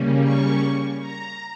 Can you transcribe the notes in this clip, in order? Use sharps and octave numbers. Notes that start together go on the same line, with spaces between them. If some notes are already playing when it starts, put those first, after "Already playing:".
Already playing: C#3 G3 A#3 C#4
C#6
A#5